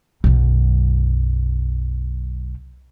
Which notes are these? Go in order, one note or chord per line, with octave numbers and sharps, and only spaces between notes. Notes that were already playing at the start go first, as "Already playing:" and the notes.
B1 F#2